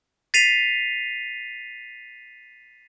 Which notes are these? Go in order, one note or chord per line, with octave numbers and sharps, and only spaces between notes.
A6 B6 C7 D#7 F7